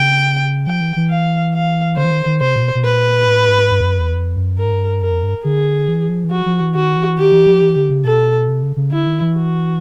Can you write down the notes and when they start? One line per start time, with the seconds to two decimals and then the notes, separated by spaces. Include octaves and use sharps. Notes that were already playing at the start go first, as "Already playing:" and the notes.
Already playing: C#3 G5
0.67 F3 G5
0.81 E3
0.96 E3
1.10 F5
1.54 F5
1.97 D3 C5
2.04 E3
2.11 D#3
2.26 D#3
2.41 C3 C5
2.56 A#2
2.62 B2
2.75 B2
2.84 A#2 B4
3.27 A2
3.48 G#2
3.71 G2
3.81 F2
3.85 F#2
4.00 E2
4.14 F2
4.36 F#2
4.58 G2 A#4
4.65 G#2
4.73 G2
5.01 F#2 A#4
5.11 F2
5.23 G2
5.44 D3 G#4
5.88 E3
6.09 F3
6.24 E3
6.31 F3 F#4
6.46 F3
6.60 E3
6.75 D#3 F#4
6.96 E3
7.18 D#3 G4
7.32 E3
7.47 F3
7.62 E3
7.76 D3
7.90 C#3
8.05 B2 A4
8.48 C3
8.63 C#3
8.77 C#3
8.91 D3 E4
9.07 D#3
9.21 E3
9.35 F#4